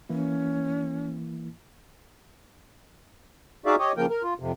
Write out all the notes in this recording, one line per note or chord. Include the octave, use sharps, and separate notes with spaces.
E3 A#3 C#4 E4
D#4 F#4 G#4 D5 E5 F5
G4 C#5 D#5
C#3 F3 A#3 A#4 G5
A#4
F4
F2 C3